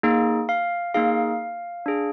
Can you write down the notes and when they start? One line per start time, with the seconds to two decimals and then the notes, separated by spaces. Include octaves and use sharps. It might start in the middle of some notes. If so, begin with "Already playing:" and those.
0.03 A#3 D#4 G#4
0.49 F5
0.94 A#3 D#4 G#4 F5
1.86 D4 G#4